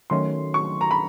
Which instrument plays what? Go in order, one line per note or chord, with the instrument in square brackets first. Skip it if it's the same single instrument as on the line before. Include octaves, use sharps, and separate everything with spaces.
[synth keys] D#3 F#3 A3 C#4 [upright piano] C6
[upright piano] C#6
A#5
B5